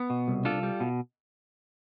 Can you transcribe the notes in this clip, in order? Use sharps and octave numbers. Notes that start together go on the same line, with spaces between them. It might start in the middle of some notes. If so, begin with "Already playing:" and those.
Already playing: B3
B2
C2
D4 F4 A4
G3
B2